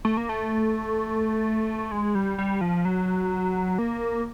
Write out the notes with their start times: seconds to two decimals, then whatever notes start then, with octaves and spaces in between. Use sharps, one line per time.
0.05 A3
0.17 A#3
0.29 A3
1.92 G#3
2.15 G3
2.38 G3
2.61 F3
2.85 F#3
3.78 A#3